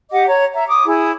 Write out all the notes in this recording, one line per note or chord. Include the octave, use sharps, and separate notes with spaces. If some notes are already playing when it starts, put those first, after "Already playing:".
G4 D#5 F#5 D6
C#5 A#5
E5 A#5
D6 D#6
E4 G#4